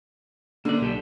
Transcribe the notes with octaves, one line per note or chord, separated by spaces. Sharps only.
D3 A#3 D4 D5
B1 G4 A4